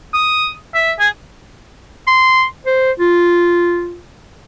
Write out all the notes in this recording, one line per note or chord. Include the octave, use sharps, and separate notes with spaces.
D#6
E5
G#4
C6
C5
F4